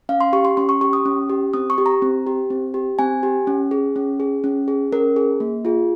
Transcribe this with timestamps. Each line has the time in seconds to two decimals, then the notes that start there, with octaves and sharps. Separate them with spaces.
0.09 C#4 F5
0.21 C6
0.33 G4 C#6
0.45 C6
0.57 C#4 C6
0.69 C#6
0.81 G4 C#6
0.93 D#6
1.05 C#4
1.29 G4
1.54 C4 D#6
1.70 C#6
1.78 G4
1.86 A#5
2.02 C4
2.27 G4
2.50 C4
2.74 G4
2.99 C4 G#5
3.23 G4
3.47 C#4
3.71 G#4
3.96 C#4
4.20 G#4
4.44 C#4
4.68 G#4
4.92 C#4 A#4
5.16 G#4
5.40 A#3
5.65 F4 G#4